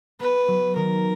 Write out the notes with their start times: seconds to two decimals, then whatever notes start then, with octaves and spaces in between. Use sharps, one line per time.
0.20 B3 B4
0.48 F#3
0.76 D#3 A#4